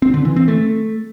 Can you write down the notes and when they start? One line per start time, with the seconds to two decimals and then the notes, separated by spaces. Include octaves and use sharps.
0.02 C4
0.14 D3
0.25 E3
0.36 C4
0.48 A3